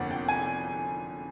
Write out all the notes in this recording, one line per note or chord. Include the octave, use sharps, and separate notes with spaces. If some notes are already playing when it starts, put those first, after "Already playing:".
Already playing: G1 F2 D3 F3 A#3 D5 F#5
G5
G#5